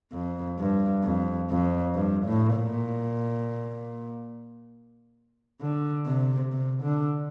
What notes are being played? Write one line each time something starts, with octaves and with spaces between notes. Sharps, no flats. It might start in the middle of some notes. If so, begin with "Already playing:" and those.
F2
G2
F2
F2
G2
A2
A#2
D3
C3
C3
D3